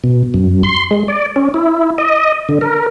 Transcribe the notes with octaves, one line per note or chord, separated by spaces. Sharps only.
B2
F#2
C6
G#3
D5
C#4
E4
D#5
D3
A#4